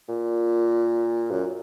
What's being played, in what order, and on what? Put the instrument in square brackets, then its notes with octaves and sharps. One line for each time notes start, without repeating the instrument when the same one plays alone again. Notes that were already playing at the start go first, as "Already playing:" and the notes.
[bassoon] A#2
F#2